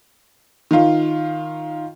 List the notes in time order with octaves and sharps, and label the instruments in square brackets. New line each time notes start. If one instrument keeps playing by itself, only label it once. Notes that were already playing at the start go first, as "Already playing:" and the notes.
[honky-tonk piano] D#3 F4